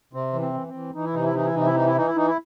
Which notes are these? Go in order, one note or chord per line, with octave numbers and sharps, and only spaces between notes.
C3 C4
E3
C4
E3
C4
E3
E3 D#4
E4
C3 D#4
E4
E3 D#4
E4
C3 D#4
E4
E3 D#4
E4
E3 D#4
E4
E3 D#4
E4